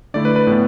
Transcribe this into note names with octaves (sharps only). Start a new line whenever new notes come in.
D3 A3 E4 D5
B4
B4
A2 E3 B3